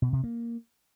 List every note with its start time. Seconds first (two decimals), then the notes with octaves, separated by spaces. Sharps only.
0.02 B2
0.13 C3
0.24 A#3